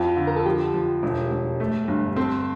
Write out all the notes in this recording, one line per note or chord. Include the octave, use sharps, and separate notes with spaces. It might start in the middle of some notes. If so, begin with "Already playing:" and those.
Already playing: F2 F4
D3
A#4
A4
F3 G4
F3
E1
E1
A3
G1
C4 A4